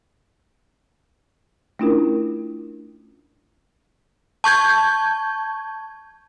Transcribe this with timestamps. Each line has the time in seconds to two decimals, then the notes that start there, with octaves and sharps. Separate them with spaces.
1.79 A3 C#4 D4 E4 F4 A#4
4.44 A5 C#6 G6 G#6